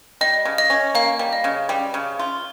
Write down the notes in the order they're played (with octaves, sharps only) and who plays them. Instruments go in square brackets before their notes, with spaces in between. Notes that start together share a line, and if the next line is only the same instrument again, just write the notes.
[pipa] G3 [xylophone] D#5
[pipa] C#3
[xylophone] D#5
[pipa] C#4
[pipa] A#3 [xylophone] F5
[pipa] G3
[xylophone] D#5
[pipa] C#3
G3
C#3
F4